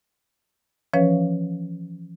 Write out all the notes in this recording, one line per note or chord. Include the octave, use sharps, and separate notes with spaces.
E3 F3 C#4 B4 C#5 F5